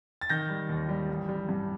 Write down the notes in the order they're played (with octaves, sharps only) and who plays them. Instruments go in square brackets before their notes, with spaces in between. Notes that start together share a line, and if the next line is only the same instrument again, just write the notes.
[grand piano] A6
D#3 G6 A#6
G3
D#2
G3
A1
G3
G2